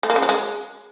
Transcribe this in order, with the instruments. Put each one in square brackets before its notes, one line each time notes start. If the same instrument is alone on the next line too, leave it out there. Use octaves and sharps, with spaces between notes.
[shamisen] A3
A#3
C#3
F#3
G#3